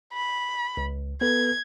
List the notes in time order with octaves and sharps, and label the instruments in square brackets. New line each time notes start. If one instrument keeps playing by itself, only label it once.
[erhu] B5
[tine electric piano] C#2
[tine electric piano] B3 A4 B4 [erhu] G#6